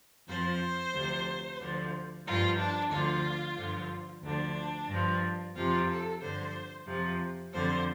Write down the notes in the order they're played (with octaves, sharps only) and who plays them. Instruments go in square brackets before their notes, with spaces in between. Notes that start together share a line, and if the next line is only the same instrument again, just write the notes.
[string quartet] F2 F3 C5
D2 C3 F3
D2 D3 F3
G2 F3 F4
D4
D2 D3 F3 F4
G2 D3 F3
D2 D3 F3 D4
G2 F3
F2 C3 F3 F4
A4
G2 D3 F3 C5
F2 C3 F3
F2 D3 F3 C5